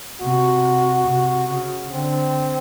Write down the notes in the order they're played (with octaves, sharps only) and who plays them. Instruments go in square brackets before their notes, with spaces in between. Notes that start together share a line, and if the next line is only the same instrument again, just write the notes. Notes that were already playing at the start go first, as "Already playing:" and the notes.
[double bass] C3 [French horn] F#4
[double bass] C3
C#3
[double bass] D3 [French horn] C4